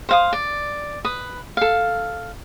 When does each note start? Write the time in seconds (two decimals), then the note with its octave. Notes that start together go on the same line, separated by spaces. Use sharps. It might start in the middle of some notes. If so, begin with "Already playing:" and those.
0.09 C5 F5 D#6
0.33 D5
1.05 B4 D#6
1.57 A4 F5